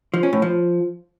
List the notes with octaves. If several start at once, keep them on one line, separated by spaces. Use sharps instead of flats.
F3
C#4
A2
F3